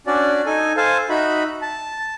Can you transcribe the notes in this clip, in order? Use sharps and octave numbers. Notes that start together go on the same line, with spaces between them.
C#4 D4 F#4 D5
D#4 A4 G#5
A4 C5 F5 G#5 A5
D#4 F#4 E5 B5
A5